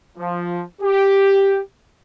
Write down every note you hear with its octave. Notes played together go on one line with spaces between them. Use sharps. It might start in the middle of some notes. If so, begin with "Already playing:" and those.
F3
G4